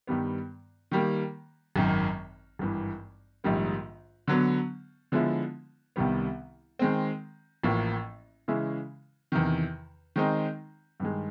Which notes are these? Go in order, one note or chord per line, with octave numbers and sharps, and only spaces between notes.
G2 D#3 G3 B3
D#3 G3 A#3
G#1 F#2 D#3
G#1 G2 E3
A#1 G#2 D#3 G3 A#3
D3 F#3 B3
D3 F3 G#3 B3 E4
C2 C3 D#3 G3 B3
D#3 G#3 C4
A1 A2 F3 A#3
C#3 E3 G#3 C#4 E4
E2 C3 D#3
D#3 G#3 C4 D#4
G2 D#3 G#3